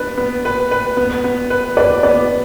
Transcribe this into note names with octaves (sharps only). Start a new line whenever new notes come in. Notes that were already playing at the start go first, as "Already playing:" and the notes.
Already playing: B3 D4 B4
B3
B4
B4
B3
B3
B4
B4 D5
B3 D5